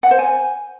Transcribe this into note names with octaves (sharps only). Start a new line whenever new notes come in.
F#5
C5
G#5